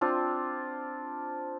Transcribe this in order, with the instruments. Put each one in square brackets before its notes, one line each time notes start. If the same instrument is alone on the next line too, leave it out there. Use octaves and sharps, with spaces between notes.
[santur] C4 D4 F4